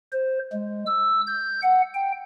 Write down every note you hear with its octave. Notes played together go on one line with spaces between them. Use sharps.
C5
G#3
E6
G6
F#5
G5